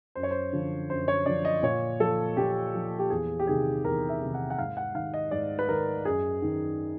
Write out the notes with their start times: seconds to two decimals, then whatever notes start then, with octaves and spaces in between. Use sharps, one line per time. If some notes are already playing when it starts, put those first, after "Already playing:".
0.15 F#2 C5
0.23 C#5
0.31 C5
0.53 D3 F3
0.89 F#2 C5
1.08 C#5
1.26 D3 F3 D5
1.45 D#5
1.63 A#2 C#5
2.00 F3 A4
2.37 A#2 G4
2.74 F3
2.99 G4
3.10 E2 G#4
3.39 G4
3.47 C3 D#3 G#4
3.85 E2 A#4
4.09 E5
4.21 C3 D#3
4.34 F#5
4.50 F#5
4.58 G#2 F5
4.77 F#5
4.95 D#3 F5
5.14 D#5
5.31 G#2 D5
5.59 B4
5.69 D#3 A#4
6.05 F#2 G#4
6.42 D#3